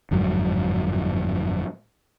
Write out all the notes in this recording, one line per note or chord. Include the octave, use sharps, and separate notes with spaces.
G1 F2 G#2 F#3